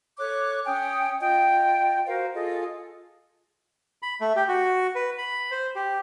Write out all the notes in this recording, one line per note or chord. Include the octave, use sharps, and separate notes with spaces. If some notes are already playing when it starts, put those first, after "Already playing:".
A4 C#5 D6 F#6
C#4 G5 G#5 D#6
F4 D#5 G5
F#4 A#4 C5 F5
F4 G#4 A4 D#5
B5
A3
G4
F#4
B4
B5
C5
G4